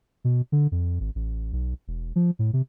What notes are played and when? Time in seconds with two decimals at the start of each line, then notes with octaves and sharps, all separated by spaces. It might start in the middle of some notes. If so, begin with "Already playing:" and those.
0.24 B2
0.52 D3
0.72 F2
1.00 G#1
1.15 A1
1.53 B1
1.88 E1
2.16 F3
2.39 A2
2.53 C3